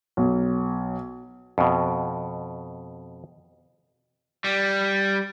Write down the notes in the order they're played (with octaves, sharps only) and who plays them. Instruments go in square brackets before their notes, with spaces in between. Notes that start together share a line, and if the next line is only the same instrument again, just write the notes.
[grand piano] B1
[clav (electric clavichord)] F2 B2
[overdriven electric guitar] G3